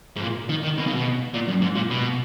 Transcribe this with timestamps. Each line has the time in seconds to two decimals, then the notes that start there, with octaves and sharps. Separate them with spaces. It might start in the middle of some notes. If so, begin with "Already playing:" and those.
0.16 G#2
0.21 A#2
0.50 D#3
0.64 D#3
0.78 B2
0.87 C#3
0.95 B2
1.34 A#2
1.48 F#2
1.62 G#2
1.75 A#2
1.90 B2